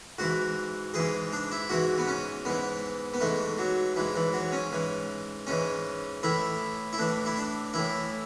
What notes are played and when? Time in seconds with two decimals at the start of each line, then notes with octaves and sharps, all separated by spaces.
0.18 G#2 E3 F#4
0.94 G#2 E3 G#4
1.33 D4
1.52 E4
1.70 G#2 E3 F#4
1.98 B3
2.08 C#4
2.45 G#2 E3 B3
3.14 B3
3.21 G#2 E3 A3
3.59 F#3
3.96 G#2 E3
4.16 E3
4.34 F#3
4.52 C#4
4.72 G#2 E3
5.47 G#2 E3 C#4
6.23 A2 E3 E4
6.93 E4
6.98 A2 E3 D4
7.26 E4
7.37 D4
7.74 A2 E3 E4